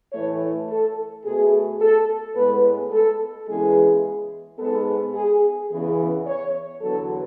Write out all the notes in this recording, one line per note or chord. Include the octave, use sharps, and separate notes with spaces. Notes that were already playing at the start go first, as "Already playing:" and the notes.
A2 E3 A3 C#5
A4
B2 A3 G#4
A4
A2 G#3 B3 B4
A4
C#3 E3 G#3 B3 G#4
G#2 G#3 B3 A4
G#4
E2 C#3 E3 B3 G#4
C#5
E2 D3 F#3 B3 A4